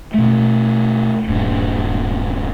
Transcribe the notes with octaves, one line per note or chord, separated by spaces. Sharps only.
B2 A3
D1 G2 A#2 D4